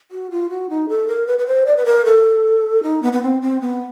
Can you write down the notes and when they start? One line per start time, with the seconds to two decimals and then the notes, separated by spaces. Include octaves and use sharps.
0.11 F#4
0.31 F4
0.50 F#4
0.70 D#4
0.89 A4
1.08 A#4
1.27 B4
1.39 B4
1.46 C5
1.66 D5
1.77 B4
1.85 A#4
2.05 A4
2.83 D#4
3.03 B3
3.13 B3
3.22 C4
3.42 C4
3.61 B3